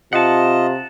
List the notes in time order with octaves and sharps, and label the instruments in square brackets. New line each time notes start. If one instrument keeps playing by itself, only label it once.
[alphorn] C3 [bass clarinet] F4 [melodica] D#5 [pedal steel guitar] F#5 A5